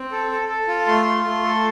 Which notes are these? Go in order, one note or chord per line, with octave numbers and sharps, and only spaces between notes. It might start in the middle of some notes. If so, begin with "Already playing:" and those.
Already playing: C4
A4
A4
A4
F4
A3 C6
F4
A3
A4